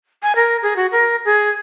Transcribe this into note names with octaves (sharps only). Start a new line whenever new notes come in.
G#5
A#4
G#4
F#4
A#4
G#4